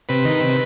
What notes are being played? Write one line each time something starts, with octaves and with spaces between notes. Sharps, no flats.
C3 B4
D#3
C3